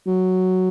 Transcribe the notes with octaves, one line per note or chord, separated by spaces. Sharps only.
F#3